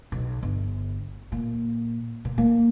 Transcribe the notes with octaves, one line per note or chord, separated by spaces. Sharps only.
B1
G1
A#2
A#2
A#3